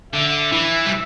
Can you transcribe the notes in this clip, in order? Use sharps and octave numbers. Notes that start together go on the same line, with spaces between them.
D3 E5
E3
G3